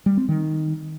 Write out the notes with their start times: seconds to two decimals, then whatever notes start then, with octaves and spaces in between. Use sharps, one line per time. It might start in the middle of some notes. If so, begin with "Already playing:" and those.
0.06 G3
0.17 C4
0.29 D#3